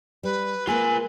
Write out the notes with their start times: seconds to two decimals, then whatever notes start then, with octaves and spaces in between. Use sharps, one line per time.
0.23 G3 B4
0.67 G#3 A#3 F4 A#4 G#5